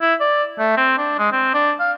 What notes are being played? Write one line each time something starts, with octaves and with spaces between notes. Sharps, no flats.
E4
D5
A3
C4
D4
G#3
C4
D4
F5